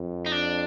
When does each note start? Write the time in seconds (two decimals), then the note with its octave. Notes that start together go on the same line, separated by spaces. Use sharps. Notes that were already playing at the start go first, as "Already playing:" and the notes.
Already playing: F2
0.26 D#4
0.32 D4